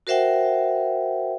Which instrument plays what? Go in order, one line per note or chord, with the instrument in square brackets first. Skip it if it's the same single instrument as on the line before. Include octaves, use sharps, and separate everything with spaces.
[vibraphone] F#4 A#4 C5 E5 F#5 G5